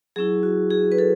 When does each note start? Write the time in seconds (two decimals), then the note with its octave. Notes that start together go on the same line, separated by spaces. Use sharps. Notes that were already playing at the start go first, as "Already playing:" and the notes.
0.16 F#3 C#4 E4 G#4
0.43 F#4
0.70 G#4
0.92 B4
0.98 A4